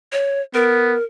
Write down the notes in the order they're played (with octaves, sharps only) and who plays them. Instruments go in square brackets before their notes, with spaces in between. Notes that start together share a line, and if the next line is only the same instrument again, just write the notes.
[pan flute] C#5
[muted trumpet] B3 [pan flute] A#4